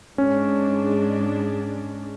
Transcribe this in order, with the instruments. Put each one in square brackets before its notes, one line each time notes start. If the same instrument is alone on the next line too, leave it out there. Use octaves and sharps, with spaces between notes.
[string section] G#2 G#3 D4 [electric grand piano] C#4